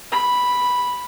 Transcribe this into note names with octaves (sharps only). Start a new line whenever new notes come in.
B5